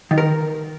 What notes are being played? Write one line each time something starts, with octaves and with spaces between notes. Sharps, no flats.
D#3
A#4